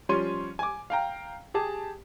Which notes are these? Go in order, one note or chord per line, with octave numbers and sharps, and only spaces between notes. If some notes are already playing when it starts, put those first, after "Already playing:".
F3 G3 C#4 C#5 C6 D#7
G#5 D6
F5 G5 A#5
G4 G#4 A5